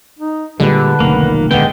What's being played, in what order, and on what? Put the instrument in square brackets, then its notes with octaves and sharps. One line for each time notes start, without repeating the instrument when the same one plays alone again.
[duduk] D#4
[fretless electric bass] A#2 G3 G#3 [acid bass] D3 [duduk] B4
[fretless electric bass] F1 B1 [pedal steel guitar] D#3 A#3
[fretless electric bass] D#1 B3 [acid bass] D3 [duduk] G#3 [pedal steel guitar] G5